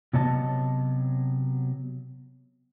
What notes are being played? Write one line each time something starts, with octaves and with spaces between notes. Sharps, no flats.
C3 F#3 B3 C#5 D#5 A5